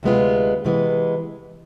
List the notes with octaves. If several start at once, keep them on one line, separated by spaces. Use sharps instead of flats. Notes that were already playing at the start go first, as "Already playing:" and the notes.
D2 C3 G#3 B3 F4
C3 E3 G#3 B3